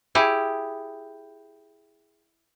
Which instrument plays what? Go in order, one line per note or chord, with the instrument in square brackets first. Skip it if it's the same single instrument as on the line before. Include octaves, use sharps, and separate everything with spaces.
[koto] E4 G4 G#4